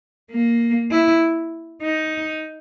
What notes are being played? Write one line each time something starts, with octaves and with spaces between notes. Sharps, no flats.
A#3
E4
D#4